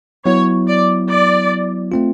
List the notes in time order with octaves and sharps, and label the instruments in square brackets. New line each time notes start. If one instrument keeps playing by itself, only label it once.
[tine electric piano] F#3 B3 E4 [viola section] C#5
[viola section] D5
D5
[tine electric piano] A3 C4 F4